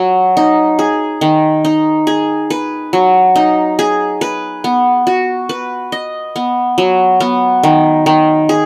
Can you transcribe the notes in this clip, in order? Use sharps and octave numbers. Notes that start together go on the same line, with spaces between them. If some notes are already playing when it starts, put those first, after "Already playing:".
Already playing: F#3
D#4
G#4
D#3
D#4
G#4
B4
F#3
D#4
G#4
B4
B3
F#4
B4
D#5
B3
F#3
B3
D#3
D#3
G#4